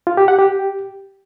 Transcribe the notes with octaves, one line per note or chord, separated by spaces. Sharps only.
F4
G4
F#5
G4